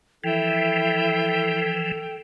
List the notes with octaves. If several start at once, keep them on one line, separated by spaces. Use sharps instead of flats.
E3 F3 E4 A4 G5